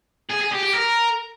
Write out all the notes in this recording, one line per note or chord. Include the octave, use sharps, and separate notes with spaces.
G#4
G#4
G4
G4
A#4